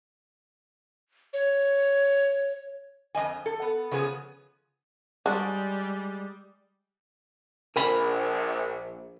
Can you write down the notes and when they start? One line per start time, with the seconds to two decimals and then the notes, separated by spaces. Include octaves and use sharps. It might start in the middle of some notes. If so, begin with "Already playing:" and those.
1.33 C#5
3.15 F2 A#3 D#5 G#5
3.46 A4
3.62 B3
3.91 C#3 F3 B3 G#4
5.26 G3 G#3 D4 F#4 D5 D6
7.76 A#1 A#4 G#5 B5